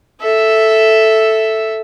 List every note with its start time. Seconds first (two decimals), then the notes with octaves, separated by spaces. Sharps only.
0.21 A4 E5